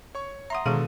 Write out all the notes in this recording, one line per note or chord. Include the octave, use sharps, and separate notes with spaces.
C#5 C#6
E5 F#5 A#5 C6 D#6
B2 D3 D#3 G#3 G#4 A4 D#7